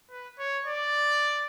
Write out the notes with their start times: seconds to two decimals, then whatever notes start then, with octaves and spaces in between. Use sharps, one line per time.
0.11 B4
0.38 C#5
0.67 D5